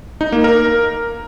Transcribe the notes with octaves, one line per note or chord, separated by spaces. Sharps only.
D#4
A#3
A#4